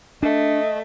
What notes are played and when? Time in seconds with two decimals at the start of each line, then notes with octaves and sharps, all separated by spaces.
0.23 A3 D4 D#5